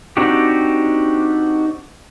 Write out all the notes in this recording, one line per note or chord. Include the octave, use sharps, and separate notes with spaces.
C4 D4 D#4 F#4 G4